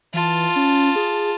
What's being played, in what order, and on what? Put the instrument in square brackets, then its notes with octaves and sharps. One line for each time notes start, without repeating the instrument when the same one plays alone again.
[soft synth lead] E3 [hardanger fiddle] F4 A5
[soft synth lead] C#4
G#4